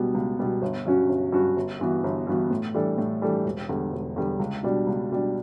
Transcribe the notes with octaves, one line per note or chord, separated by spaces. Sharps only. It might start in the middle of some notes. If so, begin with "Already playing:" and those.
Already playing: C#2 B2 G3 B3
C#2
B2 G3 B3
G1
G2 F#3 C#4 F#4
G1
G2 F#3 C#4 F#4
G1
G2 E3 B3 F#4
G1
G2 E3 B3 F#4
A2
E3 G3 D4 A4
A2
E3 G3 D4 A4
E1
E2 D3 G3
E1
E2 D3 G3
C#2
B2 G3 D4
C#2
B2 G3 D4